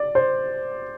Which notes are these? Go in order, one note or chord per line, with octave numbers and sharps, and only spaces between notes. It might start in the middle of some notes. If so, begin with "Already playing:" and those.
Already playing: D5
C5